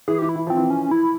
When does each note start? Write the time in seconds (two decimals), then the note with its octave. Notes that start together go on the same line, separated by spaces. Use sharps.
0.08 E3 G#4
0.18 E3 G4
0.29 E4
0.36 E3
0.47 F3 C4
0.57 E3
0.70 C#4
0.91 E4